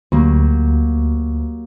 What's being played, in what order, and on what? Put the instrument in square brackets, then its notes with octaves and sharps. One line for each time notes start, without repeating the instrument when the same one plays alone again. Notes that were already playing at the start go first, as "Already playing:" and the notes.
[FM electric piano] D2 [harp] F#3 A#3 G4